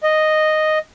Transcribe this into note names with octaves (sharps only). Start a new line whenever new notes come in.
D#5